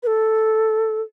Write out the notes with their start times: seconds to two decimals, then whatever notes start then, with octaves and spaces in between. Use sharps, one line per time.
0.03 B4
0.07 A4